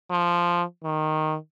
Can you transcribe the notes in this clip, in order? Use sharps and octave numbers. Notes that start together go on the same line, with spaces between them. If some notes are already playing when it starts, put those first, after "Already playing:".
F3
D#3